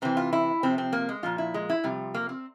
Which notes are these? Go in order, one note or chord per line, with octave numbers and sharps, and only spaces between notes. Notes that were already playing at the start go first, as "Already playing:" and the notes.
C3 E3 C4
F4
E4
C3 F3 C4
C4
A#3
G#3
A#2 F3 F4
E4
G#3
E4
C3 F3 G3
A#3
C4